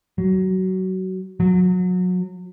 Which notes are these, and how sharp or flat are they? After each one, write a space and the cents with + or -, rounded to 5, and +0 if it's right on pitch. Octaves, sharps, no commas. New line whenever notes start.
F#3 +20
F#3 -25